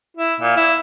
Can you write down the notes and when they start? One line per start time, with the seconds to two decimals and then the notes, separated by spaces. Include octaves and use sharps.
0.17 E4
0.40 A#2
0.56 E4